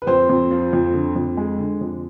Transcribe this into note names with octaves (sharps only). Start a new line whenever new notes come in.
B4
F2 C4 C5
F2
F3
F2
D3
F2
G#3
D3
F2